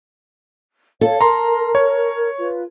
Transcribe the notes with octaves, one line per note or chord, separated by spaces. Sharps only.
A4 C#5 F5
A#4 A#5 C6
C#5
F4 B4